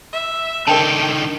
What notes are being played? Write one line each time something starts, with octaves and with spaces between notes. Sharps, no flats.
E5
D3 D#3 A#4 G5 A5 G6